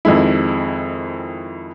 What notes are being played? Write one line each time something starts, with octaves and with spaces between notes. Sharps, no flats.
F2 D#3 G#3 E4